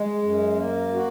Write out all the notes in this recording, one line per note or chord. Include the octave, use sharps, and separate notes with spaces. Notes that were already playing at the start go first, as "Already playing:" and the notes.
Already playing: G#3
F#2
A#3
F#4